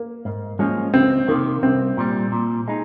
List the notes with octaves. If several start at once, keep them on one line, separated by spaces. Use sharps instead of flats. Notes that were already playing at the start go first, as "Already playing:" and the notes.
Already playing: A#3
G#2
F3 G#3 A#3 C#4
C#2 C4
C3 D#3 A#3
C2 C4
A#2 G3
A#2
G#3 D#4